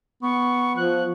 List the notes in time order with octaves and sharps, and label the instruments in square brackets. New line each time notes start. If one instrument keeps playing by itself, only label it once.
[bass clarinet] B3 [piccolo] C#6
[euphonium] F3 [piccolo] F#6